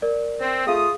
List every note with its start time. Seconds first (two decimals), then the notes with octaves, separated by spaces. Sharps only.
0.02 A#4 D5
0.41 C4
0.67 A3 F4 G#4 F5 D#6